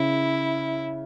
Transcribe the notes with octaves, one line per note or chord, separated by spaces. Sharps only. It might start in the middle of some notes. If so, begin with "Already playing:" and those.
Already playing: C#3 E4